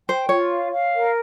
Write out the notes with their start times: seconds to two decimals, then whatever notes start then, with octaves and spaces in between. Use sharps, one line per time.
0.08 C5 G5
0.29 F4 C#5
0.50 F5
0.72 F5
0.93 A#4